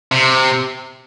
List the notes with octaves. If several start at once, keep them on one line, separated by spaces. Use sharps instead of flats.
C3